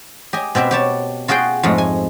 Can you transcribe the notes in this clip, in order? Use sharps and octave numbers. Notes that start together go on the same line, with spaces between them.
G4 D#5 G#5
B2 C4 G4 E5
G4 C#5 A5
F4 F#4 G#4 F5 G5
F2 G#2 G#3 A3
G#5